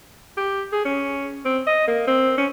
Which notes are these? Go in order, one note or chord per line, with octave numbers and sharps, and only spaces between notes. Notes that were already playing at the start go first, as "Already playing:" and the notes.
G4
G#4
C#4
C4
D#5
A#3
C4
C#4